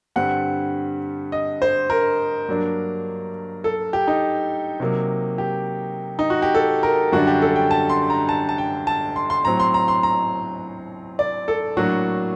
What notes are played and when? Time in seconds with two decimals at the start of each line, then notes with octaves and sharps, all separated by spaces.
0.16 G2 D3 G3 C4 F#5
1.32 D#5
1.62 C5
1.90 A#4
2.48 G2 F#3 A#3 D4
3.64 A4
3.93 G4
4.07 D#4
4.80 C3 F#3 A#3
5.38 G4
6.19 D#4
6.30 F#4
6.42 G4
6.55 A4
6.83 A#4
7.12 F#2 D3 G3 D4 F#4
7.27 G4
7.42 A4
7.56 G5
7.71 A5
7.90 C6
8.10 A#5
8.29 A5
8.49 A5
8.58 G5
8.87 A5
9.16 C6
9.30 C6
9.45 A2 F#3 C4 A#5
9.60 C6
9.74 A#5
9.88 C6
10.03 A#5
11.19 D5
11.48 A4
11.77 A2 F#3 A#3 D4 F#4